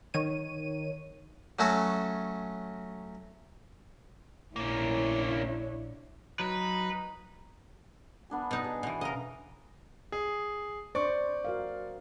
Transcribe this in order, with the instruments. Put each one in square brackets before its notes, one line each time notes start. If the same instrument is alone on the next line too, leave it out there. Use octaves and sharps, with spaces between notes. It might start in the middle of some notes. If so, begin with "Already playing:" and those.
[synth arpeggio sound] D#3 C#5 D#7
[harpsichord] F#3 A3 C#4 F#4 A4
[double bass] A#1 D4 [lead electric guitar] A#3 C#4 [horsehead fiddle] E4 C#5
[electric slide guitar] F#3 [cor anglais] D#4 [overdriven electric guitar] B4
[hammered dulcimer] B3 D4 G#5
[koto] B2 D#4 [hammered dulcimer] D5 A5
[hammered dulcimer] G#4
[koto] B2 E3 [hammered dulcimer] C6
[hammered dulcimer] C#3 A#5 [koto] A#4 D#5
[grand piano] G#4
[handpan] D4 C5 [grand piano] D5 C#6
[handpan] F#4 A#4 F5